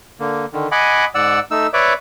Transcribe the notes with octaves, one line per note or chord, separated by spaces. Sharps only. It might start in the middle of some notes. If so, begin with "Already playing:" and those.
D3 A#3
D3 D#3
D#5 F#5 G#5 B5 D6
G#2 D5 F#5 E6
A3 D#4 E6
B4 C#5 D5 E5 D6